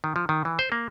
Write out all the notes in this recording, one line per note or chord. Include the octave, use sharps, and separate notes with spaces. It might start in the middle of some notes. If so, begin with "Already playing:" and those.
D#3
F3
D#3
E3
C5
A#3